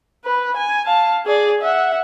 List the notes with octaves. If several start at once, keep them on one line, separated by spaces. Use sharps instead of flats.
B4
G#5
F5 A5
G#4 D5
E5 F#5